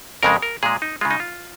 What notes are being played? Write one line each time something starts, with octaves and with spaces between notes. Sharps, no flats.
F2 C#3 G#3 A#4
A#4
A#2 G#3 G#4
D#4
C#3 G#3 F4
D#4
F4